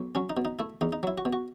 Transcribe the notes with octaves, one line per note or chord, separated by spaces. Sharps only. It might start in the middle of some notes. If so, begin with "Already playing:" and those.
Already playing: B1
F#3 C#4
D#4
B2
D#4
A3 E4
E2 D#4
D#4
F#3 E4
F#4
B2
F#4